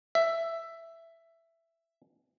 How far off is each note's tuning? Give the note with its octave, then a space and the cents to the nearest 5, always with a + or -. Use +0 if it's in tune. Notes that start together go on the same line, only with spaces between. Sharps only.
E5 +10